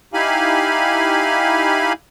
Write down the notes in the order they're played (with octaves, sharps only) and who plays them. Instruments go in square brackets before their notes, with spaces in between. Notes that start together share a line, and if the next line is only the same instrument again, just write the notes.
[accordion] D#4 E4 G4 F5 G#5 B5